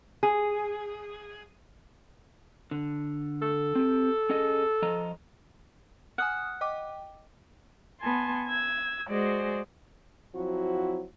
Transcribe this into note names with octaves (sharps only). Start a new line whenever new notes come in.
G#4
D3
A4
C4 G4
C#4 G#4 D#5
F3 D#5 A#5
F#5 G#5 D#6 F6
D#5 G5 D6
B3 G#5 A5 C6
E6 G#6
G#3 F#4 G#4 C5 D5
F3 F#3 C4 E4 F#4